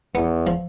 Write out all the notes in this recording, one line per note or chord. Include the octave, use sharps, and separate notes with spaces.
E2 B3
F3